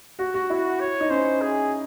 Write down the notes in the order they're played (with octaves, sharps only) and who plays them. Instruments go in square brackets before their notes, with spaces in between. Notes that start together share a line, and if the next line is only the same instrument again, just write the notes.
[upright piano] F#4
F#4
[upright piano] E4 [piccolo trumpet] F#4
[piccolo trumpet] C#5
[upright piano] D#4
[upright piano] C#4 [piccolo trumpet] C5
[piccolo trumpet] G#4